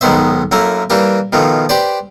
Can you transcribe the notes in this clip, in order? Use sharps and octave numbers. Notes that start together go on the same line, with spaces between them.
B1 G#2 D#3 B3 C5 E5
F#2 A3 A#3 E4 A#4
E3 G3 A#3 G4 A#4
B2 D#3 F3 A3
G4 B4 C5 D5